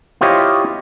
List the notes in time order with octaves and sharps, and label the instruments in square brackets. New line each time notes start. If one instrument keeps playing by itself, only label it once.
[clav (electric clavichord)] E4 F4 G4 C5 C#5 D#5